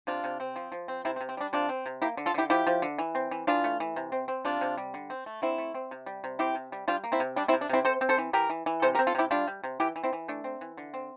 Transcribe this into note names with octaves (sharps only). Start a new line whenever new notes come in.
C3 D4 F4
C3
C4
F3
F3
C4
C3 C4 E4
C4
C3
C4
G3 D4
C3 D4 F4
C4
C3
A#3 E4 G4
D3
F4 A4
D3 E4 G4
F3 E4 G4
F3
D3
E3
C4
E3
E3 D4 F4
A3
E3
C3
C4
C4
C3 D4 F4
C3
G3
D3
C4
A3
D3 C4 E4
A3
C4
C3
G3
C3
C4 E4 G4
C3
G3
G3 D4 F4
A#3
C4 E4
C3
G3 D4
C4 E4
C3
D4
C3 C4 E4
C4 A4 C5
C4
A4 C5
E3
E3 G4 A#4
E3
E3
C3 A4 C5
G4 A#4
C4
F4 A4
C3 E4 G4
G3 D4 F4
G3
C3
E3 E4 G4
E3
C4 E4
E3
A3 D4
C4
E3
D3
C4